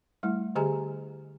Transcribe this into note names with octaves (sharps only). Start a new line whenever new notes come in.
G3 A3 E4
D3 G4 G#4 D#5 G#5 A#5